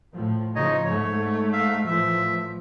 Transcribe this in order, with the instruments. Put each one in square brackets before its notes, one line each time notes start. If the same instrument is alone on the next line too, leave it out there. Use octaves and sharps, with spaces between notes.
[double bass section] A2 F3
[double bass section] C#3 F3 [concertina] D#4 C#5 D#5
[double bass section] G#2 A3 [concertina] C#5
[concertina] E5 F5
[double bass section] A2 E3 F3 [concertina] E5